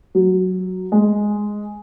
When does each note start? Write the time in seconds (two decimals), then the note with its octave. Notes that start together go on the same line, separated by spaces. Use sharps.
0.15 F#3
0.92 G#3